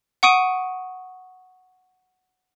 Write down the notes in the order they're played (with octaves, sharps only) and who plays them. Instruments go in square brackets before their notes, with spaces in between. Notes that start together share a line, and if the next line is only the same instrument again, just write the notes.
[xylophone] F#5 C#6 D#6 D7 D#7